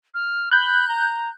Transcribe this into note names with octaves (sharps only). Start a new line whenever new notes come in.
F6
B5 F#6 G6
A#5